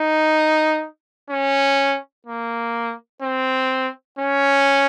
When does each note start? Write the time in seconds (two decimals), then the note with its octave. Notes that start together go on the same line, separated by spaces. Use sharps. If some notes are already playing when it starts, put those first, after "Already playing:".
Already playing: D#4
1.30 C#4
2.26 A#3
3.22 C4
4.19 C#4